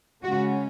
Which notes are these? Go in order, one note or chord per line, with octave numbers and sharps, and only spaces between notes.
C#3 G#3 C#4 F#4